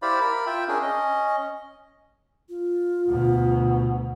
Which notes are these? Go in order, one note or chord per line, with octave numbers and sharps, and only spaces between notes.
E4 G4 C5 D5 F5 B5
A#4 B5
F4 E5 G5
C#4 D4 G#4 A#4
C#4 D#5
F4
D2 B2